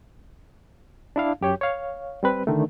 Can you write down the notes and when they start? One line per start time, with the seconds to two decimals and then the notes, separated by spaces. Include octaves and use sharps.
1.16 D4 E4 F5
1.41 F#2 G4 C#5
1.61 C#5 F5
2.23 G3 C4 B4
2.47 D3 D#3 A3